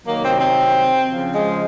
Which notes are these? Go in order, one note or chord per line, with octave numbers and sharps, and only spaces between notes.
C3 D#3 F#3 A#3
C4
C4
C#3 F3
G#3